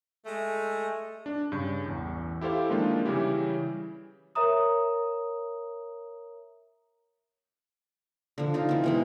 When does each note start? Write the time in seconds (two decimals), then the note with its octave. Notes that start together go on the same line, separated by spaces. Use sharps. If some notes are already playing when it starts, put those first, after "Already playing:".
0.25 G#3 A3
1.26 D4
1.52 G2 C#3 G6
1.86 A1 E2
2.41 E4 G4 A4 C5 F5
2.69 D#3 F3 G#3 A#3 D4 F4
3.05 C#3 E3 G3 C#4 E4 G4
4.35 A#4 C#5 E5 A#5 D#6
8.38 D3 F3
8.54 D#4 F4
8.69 E3 C4
8.84 B2 E3 G#3